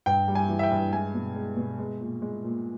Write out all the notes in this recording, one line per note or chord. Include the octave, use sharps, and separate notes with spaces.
G2 G5
G3
G#5
E3
E5
G5
G2
G#3 G#5
B2
G#3
B2
G#3
A#2
G#3
A#2